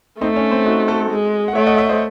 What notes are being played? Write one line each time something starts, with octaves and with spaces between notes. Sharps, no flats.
A3 C4 D#4
C#4
C4
D#4 F#4
F#4 A4
G#3
F#5
A3 C#5 E5
D#5 F#5
C#5 E5
C5 D#5